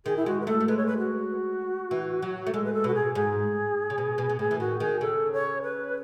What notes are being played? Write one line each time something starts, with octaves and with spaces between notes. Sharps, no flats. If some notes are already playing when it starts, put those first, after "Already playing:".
D#3 G#4
E4
G#3 F#4
B4
A3 A4
A3
G#3 B4
C#5
B4
F#4
E3
F#3
A3
G#3 A4
B4
A4
B2 F#4
G#4
G#2 G#4
C#3
B2
B2
B2
A2 G#4
E3
D#3 F#4
D#3 G#4
C#3 A4
C#5
B4